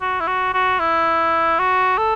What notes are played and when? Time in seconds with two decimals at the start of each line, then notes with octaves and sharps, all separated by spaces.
0.01 F#4
0.21 E4
0.27 F#4
0.54 F#4
0.79 E4
1.59 F#4
1.98 A4